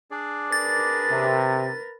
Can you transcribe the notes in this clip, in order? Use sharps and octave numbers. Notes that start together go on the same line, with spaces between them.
D4 G#4 D5
A#4 B4 A6
C3